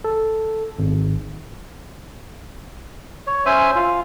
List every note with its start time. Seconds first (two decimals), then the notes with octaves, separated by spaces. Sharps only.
0.04 A4
0.79 G#1
3.27 C#5
3.46 C#4 C5 E5 G#5
3.76 F4